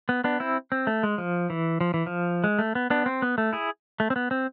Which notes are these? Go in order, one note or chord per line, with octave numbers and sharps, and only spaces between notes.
B3
B3 D4
C4 E4
C4
A3
G#3
F3
E3
F3
E3
F3
G#3
A3
B3
B3 D4
C4
B3
A3
E4 G#4
A3
C4
B3
C4